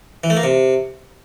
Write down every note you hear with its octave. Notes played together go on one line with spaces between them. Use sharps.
E3
A3
A#3
C3